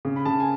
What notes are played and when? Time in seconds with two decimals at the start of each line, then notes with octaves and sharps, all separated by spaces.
0.05 C#3
0.16 B5
0.25 C#3 A5
0.40 G#5